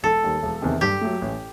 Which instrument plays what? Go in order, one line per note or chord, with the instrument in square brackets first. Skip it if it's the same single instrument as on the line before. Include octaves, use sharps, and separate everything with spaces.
[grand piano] E1 [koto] A4
[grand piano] D#2 D#3 G3
E1
E2 C3 D#3
[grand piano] G2 [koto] G4
[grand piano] F#3 A3
A1